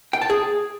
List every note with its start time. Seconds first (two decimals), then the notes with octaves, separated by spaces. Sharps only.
0.13 G5
0.22 A5
0.30 G#4